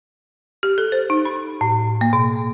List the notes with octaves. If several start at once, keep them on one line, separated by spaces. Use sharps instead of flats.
G4
A4
C5
D#4
B5
A2
A#3
B2